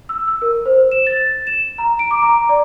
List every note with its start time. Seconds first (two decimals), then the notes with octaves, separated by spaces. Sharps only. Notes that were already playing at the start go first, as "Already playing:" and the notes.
0.09 E6
0.28 E6
0.42 A#4
0.66 C5
0.92 E7
1.07 A6
1.47 E7
1.78 A#5
1.99 D7
2.11 D6
2.22 A#5
2.49 D5